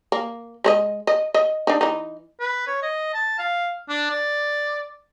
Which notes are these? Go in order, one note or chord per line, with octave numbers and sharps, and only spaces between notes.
A#3
G#3 C5 D#5
D#5
D#5
D4 D#4
E3 D#4
B4
C#5
D#5
A5
F5
D4
D5